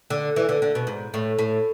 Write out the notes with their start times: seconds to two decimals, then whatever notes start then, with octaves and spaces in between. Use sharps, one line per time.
0.10 D3
0.36 E3
0.49 D3
0.62 D3
0.75 B2
0.87 G#2
1.14 A2
1.39 A2